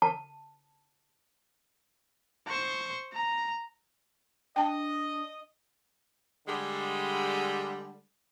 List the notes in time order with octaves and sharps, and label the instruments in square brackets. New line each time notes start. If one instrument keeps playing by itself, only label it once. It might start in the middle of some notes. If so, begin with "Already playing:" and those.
[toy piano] A5
[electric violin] C5 C#6
A#5
[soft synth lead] D4 [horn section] D#5 [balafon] G5 A5
[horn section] D3 G3 G#3